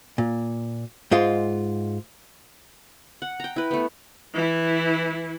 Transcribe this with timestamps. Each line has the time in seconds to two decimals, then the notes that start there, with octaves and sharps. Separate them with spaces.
0.18 A#2
1.11 G#2 G#3 F4
3.22 F#5
3.40 G5 A#5
3.56 E4 B4
3.71 A3 B3
4.34 E3 E4